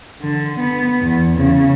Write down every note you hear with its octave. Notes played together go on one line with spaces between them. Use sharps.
D3
B3
E2
C#3